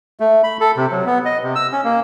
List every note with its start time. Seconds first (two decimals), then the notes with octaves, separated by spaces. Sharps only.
0.20 A3
0.44 B5
0.61 A4
0.77 C3
0.91 F#3
1.06 B3
1.26 D#5
1.43 C3
1.55 E6
1.72 C#4
1.84 A#3